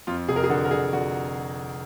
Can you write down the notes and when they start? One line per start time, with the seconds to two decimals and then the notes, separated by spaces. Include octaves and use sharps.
0.07 F2 F4
0.28 F1 G#4
0.36 A#4
0.44 G#4
0.50 D3 F#4
0.65 A#4
0.71 D3 G#4
0.93 D3 F#4